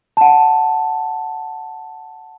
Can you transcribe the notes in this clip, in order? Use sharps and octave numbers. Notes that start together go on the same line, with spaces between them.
F#5 A5